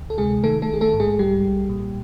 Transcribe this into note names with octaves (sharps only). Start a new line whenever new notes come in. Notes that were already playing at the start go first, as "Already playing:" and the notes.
Already playing: D2
A4
C3 G#3 G#4
D#3 A3 A4
A3 A4
A#1 G#4
A3 A4
G#2
G#3 G#4
B1 G3 G4
B1
A#2